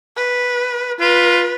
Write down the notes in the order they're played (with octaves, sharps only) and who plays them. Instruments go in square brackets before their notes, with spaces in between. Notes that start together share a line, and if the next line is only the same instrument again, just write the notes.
[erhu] B4
[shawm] F4 [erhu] B4